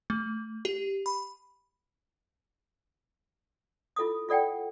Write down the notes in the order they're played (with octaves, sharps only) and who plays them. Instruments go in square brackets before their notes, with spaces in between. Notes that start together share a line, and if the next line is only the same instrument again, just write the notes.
[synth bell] A3
G4
B5
[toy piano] E4 F4 A4 D6 D#6
F4 A4 D5 F#5 G5